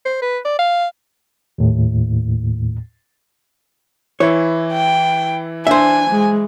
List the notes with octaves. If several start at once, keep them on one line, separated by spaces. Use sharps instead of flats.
C5
B4
D5
F5
D#2 A2
E3 E4 C#5
G5
D4 C5 E5 G#5
G#3